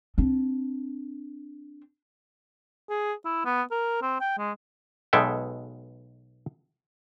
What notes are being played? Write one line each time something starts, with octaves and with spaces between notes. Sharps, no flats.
C4 D4
G#4
E4
B3
A#4
C4
G5
G#3
B1 B2 G#3 A4 E5 G5